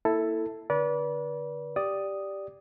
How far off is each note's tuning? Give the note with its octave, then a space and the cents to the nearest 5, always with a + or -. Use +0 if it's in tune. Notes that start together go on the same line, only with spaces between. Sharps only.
A#3 -5 E4 +0 A4 +5
D3 +0 B4 -30 D5 -30
G4 +0 D5 +0 D#6 +0